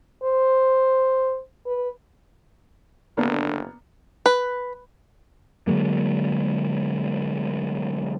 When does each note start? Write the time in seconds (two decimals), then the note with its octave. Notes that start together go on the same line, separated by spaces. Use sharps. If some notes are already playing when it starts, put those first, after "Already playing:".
0.24 C5
1.67 B4
3.17 F#1 D3 A#3 B3 D4
4.26 B4
5.67 D3 F#3 G#3 A#3